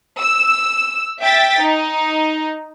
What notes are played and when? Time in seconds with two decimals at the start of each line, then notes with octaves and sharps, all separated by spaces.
0.21 E6
1.20 E5 G5 A6 B6
1.59 D#4